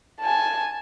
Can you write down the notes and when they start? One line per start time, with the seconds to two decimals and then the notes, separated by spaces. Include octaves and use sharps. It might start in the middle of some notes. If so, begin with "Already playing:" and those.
0.21 G#5 A5